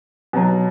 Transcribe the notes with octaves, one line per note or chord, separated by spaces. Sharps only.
B2 F#3